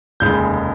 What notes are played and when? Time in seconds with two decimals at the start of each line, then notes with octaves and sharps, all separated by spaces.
0.20 F1 D#2 C#3 G#3 G6